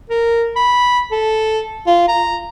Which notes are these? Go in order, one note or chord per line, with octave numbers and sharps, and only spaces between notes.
A#4
B5
A4
F4
A#5